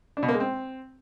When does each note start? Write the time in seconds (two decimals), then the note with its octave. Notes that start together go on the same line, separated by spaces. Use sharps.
0.17 D4
0.23 B2
0.28 A#3
0.34 G#3
0.40 C4